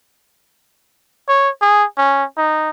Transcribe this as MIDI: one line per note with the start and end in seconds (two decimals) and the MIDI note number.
1.28 1.49 73
1.61 1.84 68
1.97 2.24 61
2.37 2.70 63